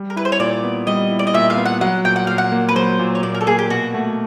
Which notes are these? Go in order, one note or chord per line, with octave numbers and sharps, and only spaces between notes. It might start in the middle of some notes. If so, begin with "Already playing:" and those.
Already playing: G3
A#4
E4 B4
C5
C#5
A#2 D5
B3
G3 D#5
E4
D5
D#5
A#2 E5
F5
B3
F#5
F#3 F#5
A#2 G5
F#5
A#2 F5
F#5
A#3
B4
F#3 C5
A#2
C#5
A#2 D5
A#4
A4
A#3 G#4
G4
B2 F#4
A3